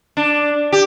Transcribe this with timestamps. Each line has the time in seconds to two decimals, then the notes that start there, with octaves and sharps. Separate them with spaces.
0.17 D4
0.72 G4